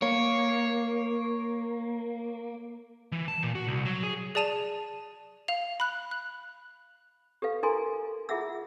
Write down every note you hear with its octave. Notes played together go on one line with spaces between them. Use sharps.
A#3 C#5
E3
A5
A#2
F#4
C2
F#3
G#4
G#4 D5 A5 D#7 F7
F5 F7
B5 F#6
F#6
G4 A4 B4 F5
D4 E4 A4 A#4 G#5 C6
E4 F4 G#4 E5 F#5 E6